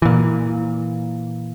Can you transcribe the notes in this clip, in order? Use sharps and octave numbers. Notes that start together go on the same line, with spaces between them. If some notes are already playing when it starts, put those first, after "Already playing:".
A#2 E3